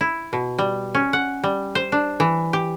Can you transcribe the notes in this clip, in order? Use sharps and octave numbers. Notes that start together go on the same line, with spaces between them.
E4
B2
G3
C#4
F#5
G3
C5
D4
E3
G4